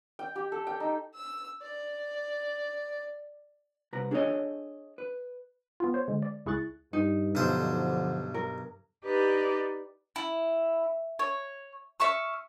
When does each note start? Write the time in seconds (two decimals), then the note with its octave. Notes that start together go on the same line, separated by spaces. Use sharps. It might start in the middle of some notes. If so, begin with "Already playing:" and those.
0.19 G5
0.36 G4
0.52 A4
0.67 G5
0.80 D#4
1.14 E6
1.62 D5
3.93 C2 B4 A#5
4.11 D4 G#4 A4 B4 C#5 D#5
4.98 B4
5.80 B3 F4
5.94 C5 C#5
6.08 D3 G#3
6.22 D5
6.46 C#2 E4 G#4 C#6 F#6 A6
6.93 G2 D#4
7.35 B1 G2 D3 F3 C5
8.34 A#4
9.04 D#4 G4 B4 D5
10.16 E4
11.19 C#5
12.00 E5 F5 C#6 E6